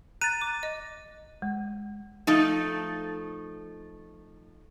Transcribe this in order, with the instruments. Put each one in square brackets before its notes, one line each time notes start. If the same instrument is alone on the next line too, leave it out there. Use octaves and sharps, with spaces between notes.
[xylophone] A#5 [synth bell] F#6 A6 [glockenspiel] D#7
[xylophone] D6
D#5
[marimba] G#3
[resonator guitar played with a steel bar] F3 A3 D#4